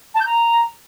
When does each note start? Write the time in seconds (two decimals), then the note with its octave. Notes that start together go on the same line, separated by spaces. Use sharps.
0.15 A5
0.20 G6
0.26 A#5